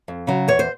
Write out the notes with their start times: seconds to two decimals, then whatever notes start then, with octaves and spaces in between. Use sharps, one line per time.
0.08 F2
0.27 C#3 F#3
0.48 E2 C#5
0.59 C5